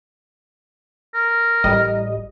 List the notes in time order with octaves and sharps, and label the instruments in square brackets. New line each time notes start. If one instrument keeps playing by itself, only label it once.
[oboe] A#4
[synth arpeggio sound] A1 G3 D#5